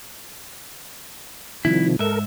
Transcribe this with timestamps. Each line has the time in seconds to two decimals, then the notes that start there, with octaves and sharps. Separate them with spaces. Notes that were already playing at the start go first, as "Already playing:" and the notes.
1.65 C2 C3 D#3 F3 E4
1.99 G#2 A4 A#4 E5